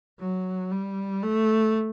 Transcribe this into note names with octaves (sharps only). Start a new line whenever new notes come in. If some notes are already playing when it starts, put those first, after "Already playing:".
F#3
G3
A3